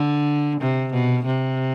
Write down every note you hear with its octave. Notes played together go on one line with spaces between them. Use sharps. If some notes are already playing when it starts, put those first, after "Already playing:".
Already playing: D3
C3
B2
C3